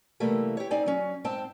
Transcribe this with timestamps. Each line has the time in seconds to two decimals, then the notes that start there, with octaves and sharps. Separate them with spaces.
0.20 C3 E3 G3 A3 A#3
0.57 G4 C#5
0.71 C4 D#4 D5 G#5
0.86 F#3 C#4
1.24 G#2 C4 G5 A5